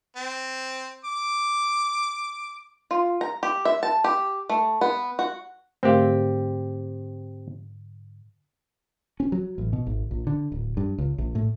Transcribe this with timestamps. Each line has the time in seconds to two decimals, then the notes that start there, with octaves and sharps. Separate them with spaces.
0.16 C4
1.04 D6
2.91 F4
3.21 A#5
3.43 G4
3.65 E5
3.83 A5
4.04 G4
4.49 A3
4.81 B3
5.19 F#4
5.83 G#2 D3 A3 C4 G4 A#4 F5
9.20 C#4
9.32 F#3
9.58 A1
9.73 B2
9.87 G#1
10.11 A#1
10.27 D3
10.52 D1
10.77 G2
10.98 C#2
11.18 A#1
11.35 A2